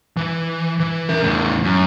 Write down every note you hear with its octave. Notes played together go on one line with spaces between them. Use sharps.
E3
E3
A#4 E5
E2 A2
F#2